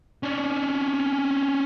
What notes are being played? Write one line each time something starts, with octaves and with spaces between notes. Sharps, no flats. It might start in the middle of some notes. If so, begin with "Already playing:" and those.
C#4 D4